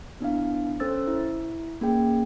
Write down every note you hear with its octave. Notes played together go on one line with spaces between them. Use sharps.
B3 D4 E4 F5
C#4 A4 C5 E6 A6
E4
A#3 C#4 G#4 G5